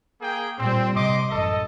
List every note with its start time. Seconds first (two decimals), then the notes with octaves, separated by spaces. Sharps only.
0.21 A#3 G#4 G5
0.58 A#2 G3 C4
0.95 C3 D#5 C6 D6
1.30 A1 F#2 A4 D#5